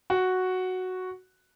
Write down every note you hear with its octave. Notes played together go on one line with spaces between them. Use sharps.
F#4